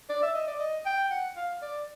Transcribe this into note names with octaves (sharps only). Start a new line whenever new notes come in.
D5
E5
D#5
D5
D#5
G5
F#5
F5
D5